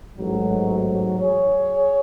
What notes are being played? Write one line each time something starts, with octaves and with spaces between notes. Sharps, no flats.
A1 G#2 F#3
G#4 C#5